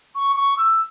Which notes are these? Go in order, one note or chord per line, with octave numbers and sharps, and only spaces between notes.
C#6
C#6
E6